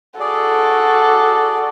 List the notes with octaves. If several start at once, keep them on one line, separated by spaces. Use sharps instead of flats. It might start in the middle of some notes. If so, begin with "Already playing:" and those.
F#4 G#4 A4 D5